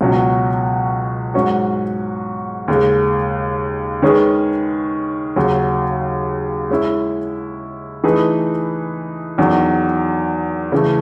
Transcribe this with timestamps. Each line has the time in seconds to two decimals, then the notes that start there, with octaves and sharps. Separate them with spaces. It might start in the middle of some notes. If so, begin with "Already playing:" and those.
0.01 C#2 B2 F#3 C#4 F#4
1.34 G#2 F#3 C#4 F#4
2.68 D#2 C#3 G#3
4.02 D#3 G#3 C#4 G#4 B4
5.36 D#2 C#3 F#3
6.70 G#3 C#4 E4
8.04 E3 A3 D#4 G#4 B4
9.38 E2 D#3 F#3
10.72 C#3 E3 A3